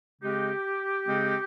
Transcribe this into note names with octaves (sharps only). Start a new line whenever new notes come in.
C#3 G#3 C4 D#4 G4
C#3 G#3 C4 D#4